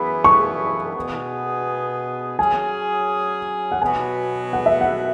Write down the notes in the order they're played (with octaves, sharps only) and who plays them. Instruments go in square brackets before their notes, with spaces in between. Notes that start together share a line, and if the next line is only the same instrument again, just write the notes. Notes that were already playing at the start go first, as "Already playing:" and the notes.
Already playing: [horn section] F#2 E3 B3 G#4 [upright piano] B5
[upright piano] C#6
[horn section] B2 B3 G#4
[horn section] F#3 C#4 G#4 [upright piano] G#5
[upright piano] F#5
[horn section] B2 F#3 B3 F#4 [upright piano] G#5
[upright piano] F#5
E5
F#5